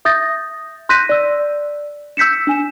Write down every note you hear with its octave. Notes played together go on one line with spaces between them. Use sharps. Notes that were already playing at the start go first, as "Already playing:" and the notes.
E5 D#6 G6 A6 A#6
C6 F#6 G6 A#6 B6 D#7
D5 E6
E6 G6 B6 C#7 E7
D4 G#5 E7